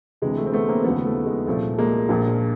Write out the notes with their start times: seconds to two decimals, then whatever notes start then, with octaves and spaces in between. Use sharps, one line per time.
0.22 D2 C3 E3 G#3
0.37 A3
0.46 C4
0.53 A3 B3
0.69 A#3 C4
0.84 D#2 C#3 F3 A3 B3
1.06 A3
1.26 G#3
1.47 C2 A#2 F3 A3
1.78 G#3 A#3
2.09 A#1 A#2 F3